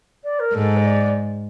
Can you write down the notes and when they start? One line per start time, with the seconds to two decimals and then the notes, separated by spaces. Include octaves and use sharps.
0.24 D5
0.39 A#4
0.54 G#2 A4
0.77 D#5
0.84 D5